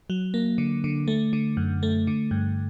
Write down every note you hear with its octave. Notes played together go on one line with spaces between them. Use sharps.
F#3
A#3
D3
D3
A3
D3
F#2
A3
D3
G2